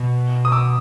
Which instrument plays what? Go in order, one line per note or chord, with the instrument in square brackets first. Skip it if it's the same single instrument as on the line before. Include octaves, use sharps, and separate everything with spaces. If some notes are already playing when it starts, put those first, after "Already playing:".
Already playing: [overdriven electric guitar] B2
[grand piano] D#6
D6 E6